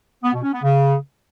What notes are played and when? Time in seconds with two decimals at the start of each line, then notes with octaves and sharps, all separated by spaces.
0.23 B3
0.33 B2
0.43 C#4
0.53 B3
0.63 C#3